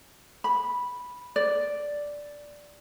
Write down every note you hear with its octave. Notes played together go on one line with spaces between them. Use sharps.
B5
D5